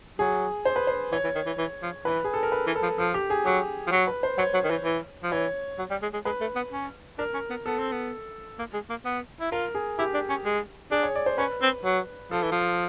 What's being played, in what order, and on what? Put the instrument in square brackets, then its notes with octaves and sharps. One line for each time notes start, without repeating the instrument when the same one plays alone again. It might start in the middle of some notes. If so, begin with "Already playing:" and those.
[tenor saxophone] F#3 [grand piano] G#4
[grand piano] C5
B4
C5
[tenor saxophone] E3 [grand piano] C#5
[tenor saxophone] E3
D#3
E3
E3
F3
[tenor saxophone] E3 [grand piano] B4
[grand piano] G#4
A4
A#4
B4
[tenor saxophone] E3
[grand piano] A4
[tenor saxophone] F3
[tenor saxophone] F3 [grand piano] A4
[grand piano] G4
G#4
[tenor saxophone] F#3 [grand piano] G4
[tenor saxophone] F3
F#3
[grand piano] B4
C5
[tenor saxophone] F#3 [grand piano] C#5
[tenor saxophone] F#3
D#3
E3
E3
F3
[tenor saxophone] E3 [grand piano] C#5
[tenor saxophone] F#3
G3
G#3
G#3
[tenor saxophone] G#3 [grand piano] B4
[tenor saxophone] A3
B3
C#4
[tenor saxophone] D4 [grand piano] A#4
[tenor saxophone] C#4
B3
[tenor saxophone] B3 [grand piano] A4
[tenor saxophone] C4
B3
A#3
G#3
A#3
B3
E4
[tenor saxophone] F4 [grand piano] A#4
[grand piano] G#4
[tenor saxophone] E4 [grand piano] G4
[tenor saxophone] D4
C#4
G#3
[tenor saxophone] D4 [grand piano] G#4
[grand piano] C#5
D5
C5
[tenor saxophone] C#4 [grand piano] B4
[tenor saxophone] C4
F#3
[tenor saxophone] F3 [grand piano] A4
[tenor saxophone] E3
F3